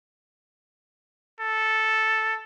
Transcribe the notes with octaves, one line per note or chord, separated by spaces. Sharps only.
A4